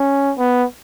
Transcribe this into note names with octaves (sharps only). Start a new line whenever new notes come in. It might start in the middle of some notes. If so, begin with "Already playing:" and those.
Already playing: C#4
B3